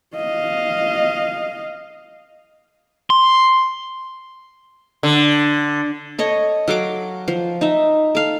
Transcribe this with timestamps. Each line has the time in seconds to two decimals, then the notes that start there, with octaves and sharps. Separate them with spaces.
0.16 D#5 F5
3.10 C6
5.03 D3
6.19 A4 C#5 D#5
6.68 F#3 A4 F5 D6
7.28 F3
7.61 D#4 E5
8.15 A4 F5